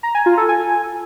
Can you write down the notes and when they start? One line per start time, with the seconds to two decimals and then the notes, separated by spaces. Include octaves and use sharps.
0.03 A#5
0.15 G#5
0.26 F4
0.37 A4
0.49 G#5